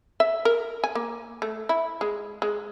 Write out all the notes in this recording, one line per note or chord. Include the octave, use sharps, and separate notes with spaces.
E5
A#4
G#5
A#3
A3
E4
G#3
G#3